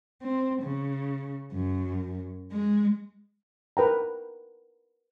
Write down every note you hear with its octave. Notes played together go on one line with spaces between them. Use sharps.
C4
C#3
F#2
G#3
A#4 B4 G5 A#5